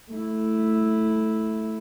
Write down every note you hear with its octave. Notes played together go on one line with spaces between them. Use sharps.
A3 E4